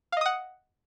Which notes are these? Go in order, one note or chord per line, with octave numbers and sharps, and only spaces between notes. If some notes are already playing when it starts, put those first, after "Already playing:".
D#5 F5 F#5 D#6